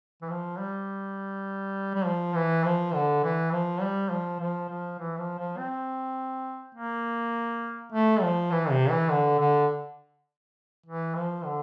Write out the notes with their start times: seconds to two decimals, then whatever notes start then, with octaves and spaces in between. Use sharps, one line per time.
0.22 E3
0.30 F3
0.59 G3
1.95 G3
2.06 F3
2.35 E3
2.64 F3
2.94 D3
3.23 E3
3.52 F3
3.82 G3
4.11 F3
4.40 F3
4.70 F3
4.99 E3
5.19 F3
5.38 F3
5.58 C4
6.75 A#3
7.92 A3
8.22 F3
8.52 E3
8.71 C3
8.90 E3
9.10 D3
9.39 D3
10.86 E3
11.15 F3
11.45 D3